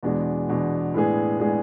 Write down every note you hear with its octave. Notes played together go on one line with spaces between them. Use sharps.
E2 B2 G#3 D4
E2 B2 G#3 D4
A2 G#3 B3 D4 G#4
A2 G#3 B3 D4 G#4